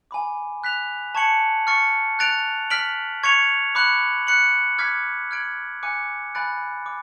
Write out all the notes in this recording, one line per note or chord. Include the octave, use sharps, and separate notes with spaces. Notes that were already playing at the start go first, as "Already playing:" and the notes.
G#5 B5 D6
F#6 B6 F7
A5 C#6 G#6 C#7 F#7
C#6 F6 A6 C#7
F#6 A6 D7 F7
F6 B6 D7 F#7
C#6 G#6 C#7 F7
B5 D6 F#6 C#7 F#7
F#6 C#7 F#7
D6 F6 G#6 B6
F6 G#6 D7 F#7
G#5 D6 F#6 C#7
G#5 B5 F#6 A6 D7
D6